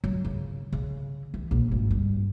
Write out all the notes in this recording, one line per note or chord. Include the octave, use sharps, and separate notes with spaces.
F#3
C#3
C#3
E3
A#1
G#1
G2